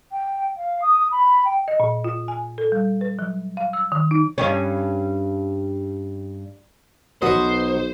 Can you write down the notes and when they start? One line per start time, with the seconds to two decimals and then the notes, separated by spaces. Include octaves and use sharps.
0.12 G5
0.57 F5
0.82 D#6
1.12 B5
1.45 G5
1.68 D#5
1.80 A#2
2.04 F4
2.28 G#5
2.58 A4
2.72 G3
3.01 B4
3.19 F#3
3.57 F5
3.73 E6
3.92 D#3
4.11 D#4
4.38 G2 G3 C#4
7.22 B1 F#3 B3 F#4 C5 D#5 C#6